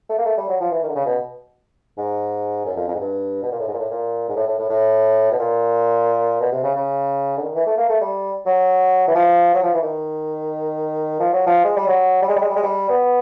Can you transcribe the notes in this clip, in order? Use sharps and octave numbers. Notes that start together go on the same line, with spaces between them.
A3
A#3
A3
G3
F#3
F3
E3
D#3
D3
C#3
B2
G#2
F#2
F2
F2
G#2
G2
B2
A#2
A2
G#2
A#2
A2
A#2
G#2
A2
A2
A2
A2
B2
A#2
B2
C3
C#3
C#3
D3
D#3
E3
A3
A#3
A3
G3
F#3
E3
F3
F#3
F3
E3
D#3
F3
F#3
F3
G#3
G3
F#3
G3
G#3
G3
G#3
G3
G#3
G3
B3